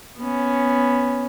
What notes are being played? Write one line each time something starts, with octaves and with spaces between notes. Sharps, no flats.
B3 C#4